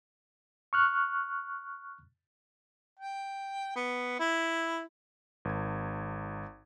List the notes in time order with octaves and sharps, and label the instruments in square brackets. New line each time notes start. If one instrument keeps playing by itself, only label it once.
[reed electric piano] C#6 F6 F#6
[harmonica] G5
B3
E4
[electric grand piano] G#1 G#6